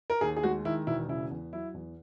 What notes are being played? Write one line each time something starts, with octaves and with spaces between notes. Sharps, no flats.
A#4
D#2 G#4
G#4
G#3 F#4
D#3 E4
E1 E4
C#3 E4
E2
F#3 E4
E2